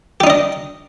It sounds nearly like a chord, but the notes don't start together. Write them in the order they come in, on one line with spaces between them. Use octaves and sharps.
G4 D#4 D4 D#5